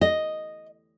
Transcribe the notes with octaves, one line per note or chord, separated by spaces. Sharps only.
D#5